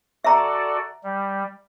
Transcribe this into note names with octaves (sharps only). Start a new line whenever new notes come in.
F#4 A4 D5 E5 A#5
G3